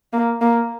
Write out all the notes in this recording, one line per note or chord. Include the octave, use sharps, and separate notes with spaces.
A#3
A#3